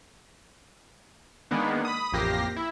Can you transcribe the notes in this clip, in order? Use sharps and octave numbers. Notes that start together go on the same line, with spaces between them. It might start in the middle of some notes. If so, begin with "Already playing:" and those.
D#3 G#3 A#3 B3 D4
B5 D#6
A1 F2 A#3 G4 A#6 C7
E4